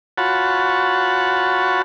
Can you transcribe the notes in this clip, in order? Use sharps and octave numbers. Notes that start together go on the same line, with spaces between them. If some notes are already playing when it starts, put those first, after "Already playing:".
F4 F#4 C#5 F#5 A5 B5